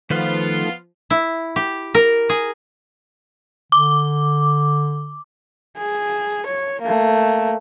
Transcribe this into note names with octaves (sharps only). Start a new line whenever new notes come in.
D#3 F3 A3 B3 D#4 F4 A4 B4
E4
G4
A#4
G#4
D3 D6
G#4
C#5
A3 A#3